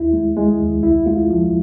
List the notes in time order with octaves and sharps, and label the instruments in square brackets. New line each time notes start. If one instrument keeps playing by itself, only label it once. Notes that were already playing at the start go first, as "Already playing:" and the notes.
Already playing: [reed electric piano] D#2 E4
G#3
G#3
D#2
C2 E4
G#3 F4
F3